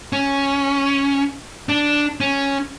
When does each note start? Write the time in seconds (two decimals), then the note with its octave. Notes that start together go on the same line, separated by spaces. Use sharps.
0.13 C#4
1.69 D4
2.20 C#4